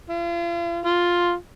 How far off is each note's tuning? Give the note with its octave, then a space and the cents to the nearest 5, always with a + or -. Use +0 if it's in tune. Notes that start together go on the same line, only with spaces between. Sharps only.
F4 -40
F4 +5